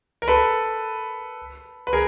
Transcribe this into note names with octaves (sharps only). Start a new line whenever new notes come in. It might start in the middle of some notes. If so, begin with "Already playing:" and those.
A#4
A4 B4
B4
G#4 A#4